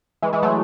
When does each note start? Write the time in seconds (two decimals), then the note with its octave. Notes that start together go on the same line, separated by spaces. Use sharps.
0.22 E3 G#3
0.33 E3 G#3
0.42 F#3 A3